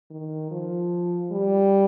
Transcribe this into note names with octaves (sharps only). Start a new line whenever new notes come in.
D#3
F3
G3